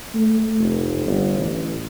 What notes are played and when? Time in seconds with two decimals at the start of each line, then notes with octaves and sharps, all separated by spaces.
0.15 A3
0.60 F1
1.05 G1
1.38 A1